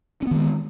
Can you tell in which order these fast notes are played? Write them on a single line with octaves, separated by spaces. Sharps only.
C#4 B3 D#3 G#3